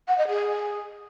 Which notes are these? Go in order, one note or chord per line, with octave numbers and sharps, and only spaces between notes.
F#5
D#5
G#4